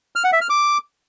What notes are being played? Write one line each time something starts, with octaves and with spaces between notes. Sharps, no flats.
F6
F#5
E5
F6
D6